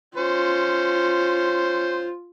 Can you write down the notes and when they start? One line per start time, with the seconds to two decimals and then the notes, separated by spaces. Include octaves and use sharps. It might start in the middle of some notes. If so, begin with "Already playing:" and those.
0.17 C#4 F4 C5